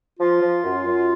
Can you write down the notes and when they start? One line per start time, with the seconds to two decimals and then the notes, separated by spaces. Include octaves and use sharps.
0.19 F3 F4
0.42 F3
0.64 F#2
0.87 F#2